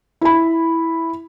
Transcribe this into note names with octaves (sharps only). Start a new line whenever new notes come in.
E4 B5